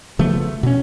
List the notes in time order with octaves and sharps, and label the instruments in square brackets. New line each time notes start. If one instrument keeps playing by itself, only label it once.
[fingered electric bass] C#3 F3 A3 B3
B2 C#4